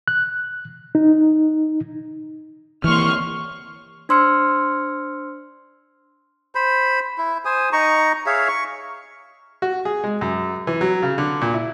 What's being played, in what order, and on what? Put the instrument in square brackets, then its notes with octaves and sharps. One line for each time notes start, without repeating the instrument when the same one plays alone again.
[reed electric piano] F#6
D#4
[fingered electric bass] E3 A#3 [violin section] C6 C#6 F6
[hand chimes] D4 C5 C6 E6 F6 C#7
[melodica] C5 B5
E4
C5 G#5 D#6
D#4 A#5 C#6
G#4 C#5 E5 F5
C#6
[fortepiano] F#4
G#4
G#3
F#2
E3
F#3
C#3
D3
A#2
E4